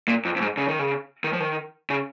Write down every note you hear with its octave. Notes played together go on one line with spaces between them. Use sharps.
A#2
F2
F2
G#2
C#3
D#3
C#3
D#3
F3
D#3
C#3